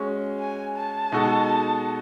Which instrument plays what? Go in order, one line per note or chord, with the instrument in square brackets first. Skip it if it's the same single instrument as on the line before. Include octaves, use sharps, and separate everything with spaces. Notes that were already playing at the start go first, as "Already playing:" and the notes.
Already playing: [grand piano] G#3 C#4 F#4
[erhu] G#5
A5
[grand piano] B2 G#3 D#4 F#4 A4